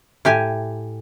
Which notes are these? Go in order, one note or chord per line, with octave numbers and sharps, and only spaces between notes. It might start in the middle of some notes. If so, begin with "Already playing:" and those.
A2 G4 G#5